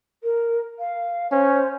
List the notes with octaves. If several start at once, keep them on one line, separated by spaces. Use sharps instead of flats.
A#4
F5
C#4 C5